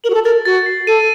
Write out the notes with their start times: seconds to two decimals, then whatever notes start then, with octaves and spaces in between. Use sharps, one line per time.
0.04 A#4 F#7
0.10 F#4
0.14 A4
0.24 A#4 A6
0.45 F#4 A6
0.66 C7
0.87 A4 D#7